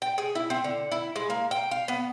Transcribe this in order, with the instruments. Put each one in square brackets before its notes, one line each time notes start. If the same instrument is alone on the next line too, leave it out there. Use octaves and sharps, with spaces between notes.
[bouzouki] G5
G#4
E4
C4
D3
E4
G#3
A#3
G5
F5
B3